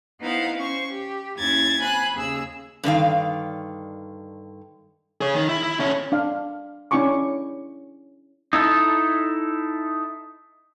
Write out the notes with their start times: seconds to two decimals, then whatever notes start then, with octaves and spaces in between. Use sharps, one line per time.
0.20 B3 D#4 E4 C5 F5 F#5
0.56 C#4 C5 C#6
0.91 G4
1.37 D#2 C#4 E4 G#6 A6
1.80 C4 G#5 B5 F#6
2.15 D#2 C#3 G#4 E6
2.83 G2 D3 D#3 F5
5.21 G#4 C#5
5.34 D#3
5.49 E4
5.63 E4
5.79 D3 C#4
6.12 D4 F5
6.91 C#4 D4 E4 G#5 C#6 D6
8.53 D#4 E4 A4